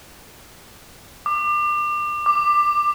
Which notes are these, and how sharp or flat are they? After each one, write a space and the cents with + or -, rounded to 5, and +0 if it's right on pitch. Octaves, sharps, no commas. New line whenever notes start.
D6 +30
D6 +15